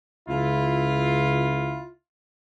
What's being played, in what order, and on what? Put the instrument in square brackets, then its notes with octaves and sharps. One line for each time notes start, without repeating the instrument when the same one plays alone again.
[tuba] C#2 [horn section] E4 F4